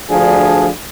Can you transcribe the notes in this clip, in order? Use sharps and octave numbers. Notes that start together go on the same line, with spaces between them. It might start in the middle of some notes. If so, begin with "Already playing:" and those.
D2 F3 D4 G#4